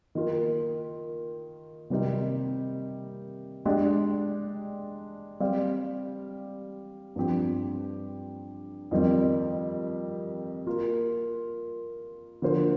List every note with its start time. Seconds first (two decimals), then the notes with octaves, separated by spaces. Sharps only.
0.15 D#3 A#3 F4 A#4
1.90 C3 D#3 G3 C4 D#4
3.65 G#3 D4 G4 D5
5.40 G3 C4 G4 D5 F5
7.16 G2 F3 C4 G4
8.91 F2 D#3 G3 C4
10.67 A#3 F4 A#4
12.42 D3 F3 A#3 F4 C5